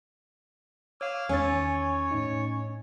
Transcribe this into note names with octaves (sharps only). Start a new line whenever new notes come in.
C#5 F5 D6 E6 F6
E2 D#3 C#4 C#5 G#5 E6 A6
A2 D#4